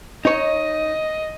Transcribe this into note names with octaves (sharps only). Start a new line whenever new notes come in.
D#4 C#5 D#5